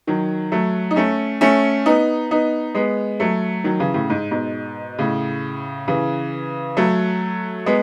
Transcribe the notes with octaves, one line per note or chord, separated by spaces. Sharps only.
D#3 F#3
F#3 A3
D#4
A3 C#4
A3 C#4
B3 D#4
B3 D#4
G#3 B3
F#3 A3
D#3 F#3
C#3 E3
A2 C#3
G#2
G#2 B2
A2 C#3
C#3 E3
F#3 A3
G#3 B3